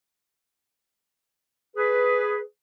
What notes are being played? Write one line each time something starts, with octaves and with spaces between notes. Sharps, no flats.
G#4 B4